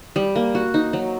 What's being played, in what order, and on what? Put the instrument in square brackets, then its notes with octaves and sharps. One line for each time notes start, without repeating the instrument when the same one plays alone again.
[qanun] G3
A#3
F#4
D#4
F#3